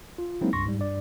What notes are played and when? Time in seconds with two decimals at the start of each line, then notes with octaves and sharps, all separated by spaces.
0.18 F4
0.41 F#3 G#3 A#3 C4 D#4 E4
0.53 C#2 G2 C6 C#6 A#6
0.65 G#2 G3
0.78 G2 D5